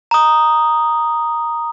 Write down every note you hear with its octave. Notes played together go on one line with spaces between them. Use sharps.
A#5 D#6